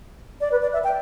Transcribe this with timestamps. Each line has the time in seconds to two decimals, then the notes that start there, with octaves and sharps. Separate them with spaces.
0.41 D5
0.52 B4
0.62 D5
0.73 E5
0.84 G5